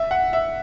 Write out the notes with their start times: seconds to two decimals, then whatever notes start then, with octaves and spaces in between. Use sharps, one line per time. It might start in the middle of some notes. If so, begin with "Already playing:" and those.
Already playing: E5
0.11 F#5
0.33 E5